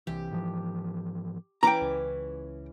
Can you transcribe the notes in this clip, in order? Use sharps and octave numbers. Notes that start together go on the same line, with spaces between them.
C2 E3 G4
G#2 E3 F3
E3 C#4 G5 A#5 D6
C#2